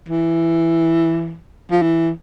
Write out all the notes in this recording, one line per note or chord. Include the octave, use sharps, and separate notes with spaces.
E3
F3
E3